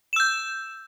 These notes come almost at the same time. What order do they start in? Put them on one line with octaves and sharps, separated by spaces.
E7 E6 G6